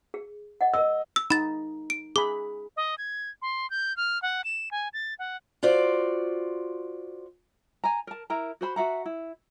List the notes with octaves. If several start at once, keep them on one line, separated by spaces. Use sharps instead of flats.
G#4
D#5 F#5
A#4 D#5 E6
E6
D#4 B5 A6
D7
G#4 B5 D6
D#5
G#6
C6
G6
F6
F#5
E7
G#5
A6
F#5
F4 F#4 C5 D5
G#5 A#5
A#4 A5
E4 A#4 A#5
F#4 C5 B5
F#4 E5 F#5 A#5
E4